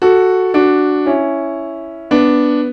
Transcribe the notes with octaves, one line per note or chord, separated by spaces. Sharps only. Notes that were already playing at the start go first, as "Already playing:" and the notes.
F#4 A4
D4 F#4
C#4 E4
B3 D4